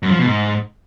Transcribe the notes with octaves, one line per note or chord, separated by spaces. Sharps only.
F#2
F3
B2
G#2